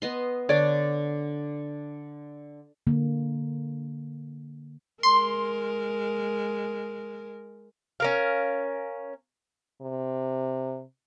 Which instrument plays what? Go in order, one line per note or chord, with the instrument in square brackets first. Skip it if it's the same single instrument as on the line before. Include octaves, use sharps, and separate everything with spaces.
[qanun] B3 D#5 C6
[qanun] D3 D4 [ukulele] C#5 D5
[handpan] D3 A#3
[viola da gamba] G#3 A#4 [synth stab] C6
[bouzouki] C#4 A#4 F5
[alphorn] C3